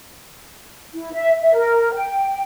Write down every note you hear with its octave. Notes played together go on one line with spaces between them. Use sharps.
E4
E5
E5
A#4
G5